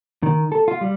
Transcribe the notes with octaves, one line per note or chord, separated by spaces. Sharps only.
D#3
A4
F4
G3